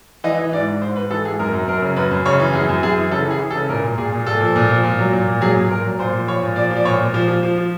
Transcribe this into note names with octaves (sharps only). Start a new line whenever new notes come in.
E3 D#5
E3
G#2 D5
G#2
G#2 C5
G#2 B4
E3 A4
G#2 G#4
F#2 A#4
F#2
F#2 A#4
C#3
F#2 B4
F#2
C#3 C#5
E3
F#2 G#4
F#2
F#2 G#4
E3
C#3 A4
E3
G#4
E3
A4
C#3
A#2 A#4
A#2
A#2 G#4
A#2
A#2 A4
F3
A#2
F3
A#2
F#3
A#2
A#2
F#3 G#4
A#2
A#2 A#4
F#3
A#2 C5
F3
F3 C#5
A#2
F3 D5
F3
D5
A#2 C#5
A#2
F3
F3
F3
F3